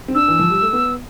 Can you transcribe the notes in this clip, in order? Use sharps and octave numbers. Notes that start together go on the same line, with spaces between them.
C4
D4 E6
E3
F3
G3
A3
B3